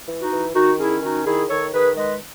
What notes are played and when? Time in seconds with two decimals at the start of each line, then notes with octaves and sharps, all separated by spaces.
0.08 E3
0.20 D#4 F#4
0.31 E3
0.55 D#3 D#4 F#4
0.78 C#4 E4 G#4
1.02 D#3 D#4 F#4
1.26 D#3 E4 G#4
1.49 D#3 A4 C#5
1.73 D#3 G#4 B4
1.97 G#3 B4 D#5